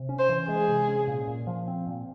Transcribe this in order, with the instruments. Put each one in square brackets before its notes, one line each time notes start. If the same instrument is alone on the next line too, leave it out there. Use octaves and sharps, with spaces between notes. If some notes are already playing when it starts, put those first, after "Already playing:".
Already playing: [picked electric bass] C3
C#4
[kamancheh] C5
[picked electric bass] E3
[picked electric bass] G#3 [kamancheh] G#4
[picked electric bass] C3
C#4
A#2
A#2
F3
C4
A#2